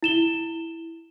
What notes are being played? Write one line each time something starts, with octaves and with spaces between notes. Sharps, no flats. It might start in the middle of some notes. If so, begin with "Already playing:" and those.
E4 E7 G7